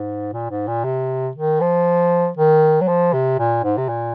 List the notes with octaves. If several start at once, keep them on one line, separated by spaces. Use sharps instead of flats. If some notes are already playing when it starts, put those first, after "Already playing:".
Already playing: G#2
A#2
G#2
A#2
C3
D#3
F3
D#3
F#3
F3
C3
A#2
G#2
C3
A#2